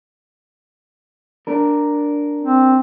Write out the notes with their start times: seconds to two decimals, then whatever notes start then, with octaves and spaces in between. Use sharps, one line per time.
1.47 D4 A#4
2.42 C4